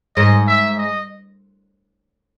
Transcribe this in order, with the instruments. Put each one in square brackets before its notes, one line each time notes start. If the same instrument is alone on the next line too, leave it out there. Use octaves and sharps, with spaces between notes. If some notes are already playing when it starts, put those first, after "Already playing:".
[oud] G#2 [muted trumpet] D#5
[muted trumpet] E5
D#5